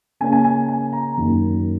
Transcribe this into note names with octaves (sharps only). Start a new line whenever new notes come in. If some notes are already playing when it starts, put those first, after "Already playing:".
C#3 A#3 C#4 G#5
G#5
G#5
G#5
A#5
F#2 D#3 F#3 A#3